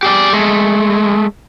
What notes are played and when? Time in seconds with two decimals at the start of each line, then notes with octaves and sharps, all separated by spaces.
0.03 G4 G#4 D5
0.33 G#3 A3